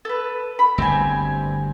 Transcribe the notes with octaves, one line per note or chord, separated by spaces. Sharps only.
A4 B4
B5
G1 D2 C4 G4 G#5